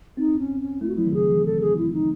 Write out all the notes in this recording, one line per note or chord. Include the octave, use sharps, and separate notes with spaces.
C4 D#4
C#4
C#4
A3 E4
F#4
F#3 E4
D#3
C#3 G#4
E3
A4
G#4
E4
D#4